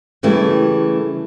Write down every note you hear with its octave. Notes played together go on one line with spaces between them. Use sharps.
C#3 E3 G3 A3